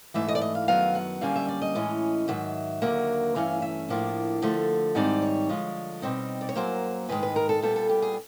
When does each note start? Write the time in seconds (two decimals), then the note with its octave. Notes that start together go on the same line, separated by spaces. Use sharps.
0.14 G#2 E3 A3 E5
0.28 D#5
0.35 D5
0.41 D#5
0.55 F5
0.68 F#2 D#3 F#3 B3 F5
0.95 F#5
1.21 F#2 D3 G3 A#3 C#4 F5
1.36 E5
1.49 D5
1.62 D#5
1.75 A2 E3 G#3 C#4
2.28 G#2 D#3 F#3 E5
2.82 D#2 D3 F#3 A#3
3.35 G2 E3 A3 C#4 F5
3.62 E5
3.89 A2 F3 A#3 D4
4.42 D3 F3 A3
4.95 G#2 D#3 G3 C4 D#4 D5
5.22 C#5
5.49 D3 F3 G#3
6.02 B2 G3 C4 D#4
6.41 D5
6.49 C#5
6.56 F#2 D3 F#3 A#3 C5
7.09 G#2 D#3 G#3 B4
7.23 B4
7.36 A#4
7.49 A4
7.62 A#2 G3 B3 A4
7.76 A4
7.90 G4
8.02 G#4